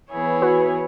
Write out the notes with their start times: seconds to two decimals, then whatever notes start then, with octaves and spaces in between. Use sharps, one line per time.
0.12 E3 B3 E4 G#4 C#5
0.42 F#4 B4